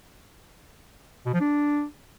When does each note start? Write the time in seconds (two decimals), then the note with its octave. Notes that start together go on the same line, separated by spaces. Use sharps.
1.26 B2
1.33 F3
1.41 D4